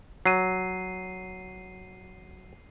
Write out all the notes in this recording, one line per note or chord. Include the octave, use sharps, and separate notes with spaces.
F#3 C7 D#7